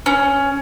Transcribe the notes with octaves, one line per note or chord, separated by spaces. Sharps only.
C#4